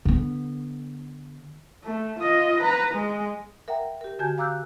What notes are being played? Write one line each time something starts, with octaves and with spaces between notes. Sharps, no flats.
D3 B3
A3
F4 D#5
B4 A#5
G#3
A#4 E5 F#5 G5 A#5
G4 A#4
D3 F#4 G#5 A5 G6 G#6
F5 A#5 D6 E6 F#6 G6